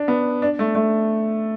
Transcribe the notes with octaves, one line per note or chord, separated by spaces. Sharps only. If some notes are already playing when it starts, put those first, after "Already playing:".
Already playing: D4
B3
D4
A3
A3